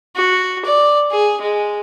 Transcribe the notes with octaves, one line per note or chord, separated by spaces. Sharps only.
F#4
D5
G#4
G#3